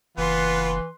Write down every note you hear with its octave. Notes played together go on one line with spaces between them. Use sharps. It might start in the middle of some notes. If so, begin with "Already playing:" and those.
F#1 E3 B3 F4 B4 C6